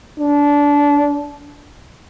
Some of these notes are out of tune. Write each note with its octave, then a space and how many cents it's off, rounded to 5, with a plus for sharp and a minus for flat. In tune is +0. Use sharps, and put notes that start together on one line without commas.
D4 -20